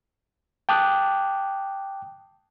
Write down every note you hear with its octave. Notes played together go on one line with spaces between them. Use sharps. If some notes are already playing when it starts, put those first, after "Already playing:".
G5 A5 D6 D#6 F#6